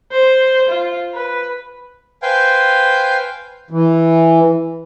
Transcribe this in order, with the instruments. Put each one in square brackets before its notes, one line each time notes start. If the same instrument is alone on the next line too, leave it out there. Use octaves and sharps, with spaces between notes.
[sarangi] C5
F4
B4
[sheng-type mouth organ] B4 C5 F5 G5 G#5 G6
[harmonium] E3